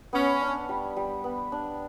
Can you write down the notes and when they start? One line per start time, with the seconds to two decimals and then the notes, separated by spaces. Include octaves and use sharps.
0.13 B3 C#4
0.41 D4
0.69 G3
0.96 G3
1.24 B3
1.52 D4